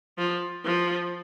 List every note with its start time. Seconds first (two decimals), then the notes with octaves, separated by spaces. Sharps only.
0.18 F3
0.65 F3